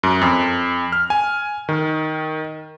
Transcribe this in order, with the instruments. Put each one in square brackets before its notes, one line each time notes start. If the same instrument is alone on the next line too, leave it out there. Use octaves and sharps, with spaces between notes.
[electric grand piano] F#2
F2
F6
G#5
D#3